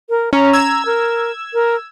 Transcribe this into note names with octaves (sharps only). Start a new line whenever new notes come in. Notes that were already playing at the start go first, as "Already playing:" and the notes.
A#4
C#4 A#5
E6 G#6
A#4
A#4